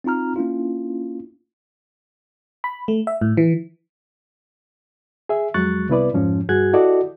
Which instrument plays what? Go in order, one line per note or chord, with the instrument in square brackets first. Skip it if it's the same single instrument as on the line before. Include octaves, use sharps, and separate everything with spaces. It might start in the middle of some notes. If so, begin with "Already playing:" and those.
[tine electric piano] C4 D#4 F4 A#5 F6
A#3 C#4 D4 E4 F4
[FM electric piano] B5
A3
E5
A2
E3
[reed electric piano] G#4 E5
F2 F#3 G#3 C#6 F#6 A6
C2 C3 B3 E4 B4 D5
F2 G#2 F3 C#4
G2 F#4 G#4 F#6 G#6
E4 F#4 G4 A4 D5 D#5